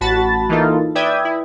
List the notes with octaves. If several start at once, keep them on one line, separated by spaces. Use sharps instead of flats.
A1 F#4 A5 B5 A6
E3 A#3 D#4 F4 A4
B4 D5 E5 G5 D#6 G#6
E4